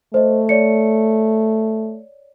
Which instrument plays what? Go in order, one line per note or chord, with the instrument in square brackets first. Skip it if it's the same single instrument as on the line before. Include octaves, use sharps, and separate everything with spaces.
[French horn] A3 [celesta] C5 D#5
[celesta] C#5 D5 C#7